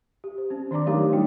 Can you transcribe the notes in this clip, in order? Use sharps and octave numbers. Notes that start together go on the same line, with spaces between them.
G4
C5
C4 C#4
D#3 D4 D5 A#5 D6
F#3 A3 D#4 G4 A#4 C#5
G3 D4 D#4 F4 F#4 G5